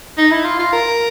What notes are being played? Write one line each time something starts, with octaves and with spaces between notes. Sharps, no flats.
D#4
E4
F4
F4
A#4